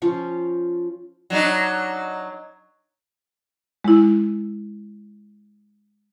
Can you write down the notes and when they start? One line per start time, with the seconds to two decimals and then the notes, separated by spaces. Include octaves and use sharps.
0.02 F3 C#4 F4 C#6
1.30 F#3 D4 D#4
3.84 G#3 E4